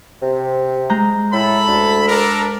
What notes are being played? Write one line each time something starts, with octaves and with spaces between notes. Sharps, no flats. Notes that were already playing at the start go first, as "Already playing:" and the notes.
C3
G#3 A#5 G6
A2 A4 B5
D2
D4 A4 A#4